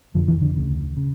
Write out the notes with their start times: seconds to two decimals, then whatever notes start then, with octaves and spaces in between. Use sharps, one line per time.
0.14 F1 F2 D3 F3
0.28 E3
0.42 D3
0.56 D2 C#3
0.97 C#3